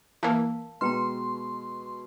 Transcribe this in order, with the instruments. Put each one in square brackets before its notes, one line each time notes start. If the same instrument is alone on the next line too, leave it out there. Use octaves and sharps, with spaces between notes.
[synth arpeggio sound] E3 A#3 [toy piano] A#4 F5 A5
[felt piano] B2 G#3 [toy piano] B4 G5 A#5 [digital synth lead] C6